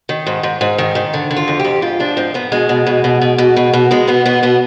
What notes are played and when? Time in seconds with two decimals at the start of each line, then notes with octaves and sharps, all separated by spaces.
0.09 D#3
0.27 G#2
0.43 G#2
0.61 G#2
0.78 D#3
0.95 D#3
1.14 D3
1.31 D3
1.37 F4
1.48 F2
1.59 G4
1.65 F2
1.82 G#2 F4
2.00 F3 D4
2.17 G#2 C4
2.34 G#2 B3
2.52 B2 G#3
2.69 B2
2.86 B2
3.04 B2
3.21 B2
3.38 B2
3.57 B2
3.73 B2
3.91 B2 G#3
4.07 B2 B3
4.26 B2 B3
4.43 B2 B3